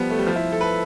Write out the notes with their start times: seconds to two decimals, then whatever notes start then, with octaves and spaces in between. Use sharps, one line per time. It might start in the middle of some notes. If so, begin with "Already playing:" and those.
Already playing: F3 G3 B3
0.10 A3
0.18 G3
0.27 F3
0.36 E4
0.52 A4
0.61 B4